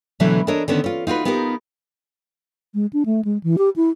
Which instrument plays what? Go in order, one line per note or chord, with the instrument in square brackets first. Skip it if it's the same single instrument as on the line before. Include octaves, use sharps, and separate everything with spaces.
[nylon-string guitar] B2 D3 E3 F#3 A3
D4 A4 A#4 C#5 D#5
D3 D#3 B3 C#4
C#4 F4
D#4 F4 F#4 B4
B3 D#4 F4 G4 A#4
[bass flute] G#3
D4
A3
G#3
E3
G4
E4